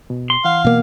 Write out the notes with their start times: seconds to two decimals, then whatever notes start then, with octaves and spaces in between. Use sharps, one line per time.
0.10 B2
0.30 C6
0.45 E3 F5 F#5
0.65 B2 A#3